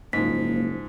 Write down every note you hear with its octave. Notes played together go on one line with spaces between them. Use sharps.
F#1 G#2 F3 A#3 B6